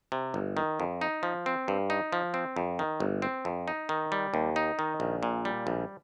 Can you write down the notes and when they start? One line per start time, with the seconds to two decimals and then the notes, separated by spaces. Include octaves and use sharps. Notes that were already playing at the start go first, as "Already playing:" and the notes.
0.12 C3
0.34 G1
0.57 D#3
0.80 F2
1.01 D#4
1.23 F3
1.46 C4
1.68 G2
1.90 D#4
2.13 F3
2.34 C4
2.56 F2
2.79 D#3
3.00 G1
3.22 C4
3.45 F2
3.68 D#4
3.89 D#3
4.12 G3
4.34 D#2
4.56 D#4
4.79 D#3
5.00 A#1
5.23 A#2
5.45 G3
5.67 A#1